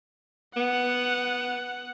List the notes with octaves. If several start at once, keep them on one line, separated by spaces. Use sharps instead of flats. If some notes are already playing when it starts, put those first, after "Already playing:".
B3 F#5